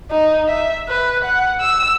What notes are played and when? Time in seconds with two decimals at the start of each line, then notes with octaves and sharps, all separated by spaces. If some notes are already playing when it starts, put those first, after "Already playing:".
0.11 D#4
0.48 E5
0.89 B4
1.25 F#5
1.61 E6